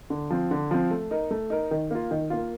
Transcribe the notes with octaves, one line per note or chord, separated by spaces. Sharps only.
D3
F3 C4
D3
F3 C4
A3
D#4 A#4
A3
D#4 A#4
D#3
A#3 F4
D#3
A#3 F4